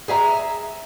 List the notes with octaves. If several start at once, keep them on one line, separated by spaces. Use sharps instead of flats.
G#4 E5 F5 A#5